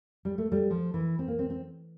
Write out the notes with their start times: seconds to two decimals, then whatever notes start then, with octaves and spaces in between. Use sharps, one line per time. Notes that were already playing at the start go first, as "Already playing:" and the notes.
0.25 G3
0.38 A3
0.52 G3
0.70 F3
0.94 E3
1.19 C4
1.28 A#3
1.39 C4
1.50 C4